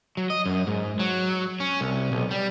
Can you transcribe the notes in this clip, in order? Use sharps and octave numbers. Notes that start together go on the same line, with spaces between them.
F#3
D#5
F#2
G#2
F#3
C#4
C2
B1
G3